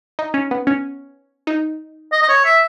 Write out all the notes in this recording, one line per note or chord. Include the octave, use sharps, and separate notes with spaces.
D#4
C#4
B3
C#4
D#4
D#5
D#5
C#5
E5